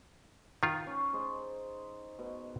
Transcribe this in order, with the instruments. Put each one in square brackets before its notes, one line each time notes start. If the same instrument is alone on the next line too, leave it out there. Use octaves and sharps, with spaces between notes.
[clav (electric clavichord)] D#3 F4
[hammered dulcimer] C#4
D#4 G#4 C5
B2